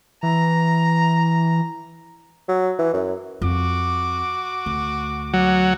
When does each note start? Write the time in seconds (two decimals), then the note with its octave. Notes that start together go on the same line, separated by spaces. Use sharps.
0.23 E3 A#5
2.48 F#3
2.79 E3
2.94 F#2
3.41 F2 F4 F#4 D6
4.66 D2
5.33 F#3